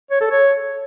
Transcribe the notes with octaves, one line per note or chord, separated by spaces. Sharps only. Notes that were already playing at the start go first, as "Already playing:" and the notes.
C#5
A4
C#5